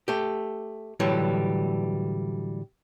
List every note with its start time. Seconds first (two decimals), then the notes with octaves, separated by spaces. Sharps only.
0.08 A3 G4
1.00 A2 D3 E3 F#3 G3